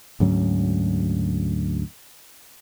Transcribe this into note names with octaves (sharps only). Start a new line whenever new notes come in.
D2 G#2 F#3 C#4